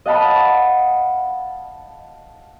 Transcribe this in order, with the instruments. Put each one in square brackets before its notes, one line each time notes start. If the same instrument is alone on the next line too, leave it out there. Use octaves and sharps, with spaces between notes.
[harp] D#5 F5 F#5 A5 B5 D#6